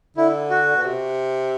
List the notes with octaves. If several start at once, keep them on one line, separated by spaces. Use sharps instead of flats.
D3 E4
F#4
B2
C3